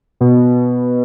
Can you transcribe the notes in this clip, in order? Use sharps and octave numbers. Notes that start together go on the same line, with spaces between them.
B2